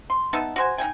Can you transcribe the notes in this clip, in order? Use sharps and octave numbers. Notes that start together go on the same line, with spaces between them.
C6
B3 D#4 E5 A5
F#4 C5 G#5
D#4 F#4 G5 G#5